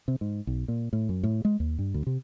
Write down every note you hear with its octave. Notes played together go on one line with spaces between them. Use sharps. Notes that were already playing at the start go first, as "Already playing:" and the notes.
C3
G#2
B1
A#2
A2
F#2
A2
G#3
D#2
G2
D2
C3